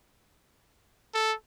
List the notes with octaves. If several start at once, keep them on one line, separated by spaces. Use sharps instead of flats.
A4